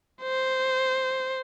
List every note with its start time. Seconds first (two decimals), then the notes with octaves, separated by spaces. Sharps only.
0.23 C5